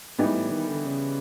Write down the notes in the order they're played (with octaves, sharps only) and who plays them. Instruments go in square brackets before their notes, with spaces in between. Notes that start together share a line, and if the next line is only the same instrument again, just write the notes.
[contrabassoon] G#2 [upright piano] E3 G3 B3 D#4
[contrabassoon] A2
D#3
D3
C#3